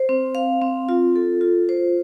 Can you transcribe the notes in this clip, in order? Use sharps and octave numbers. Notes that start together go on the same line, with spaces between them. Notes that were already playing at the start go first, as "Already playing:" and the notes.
Already playing: C5
C4
F5
C4
F4
A4
F4
C5